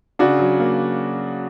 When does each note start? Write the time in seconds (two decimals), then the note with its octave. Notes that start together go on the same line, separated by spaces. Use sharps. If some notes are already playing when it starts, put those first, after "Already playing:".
0.19 C#3 D4 F#4
0.39 F#3
0.60 A#3